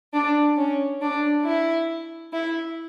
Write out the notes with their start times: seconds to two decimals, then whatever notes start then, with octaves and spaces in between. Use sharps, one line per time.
0.13 D4
0.57 C#4
1.01 D4
1.44 E4
2.32 E4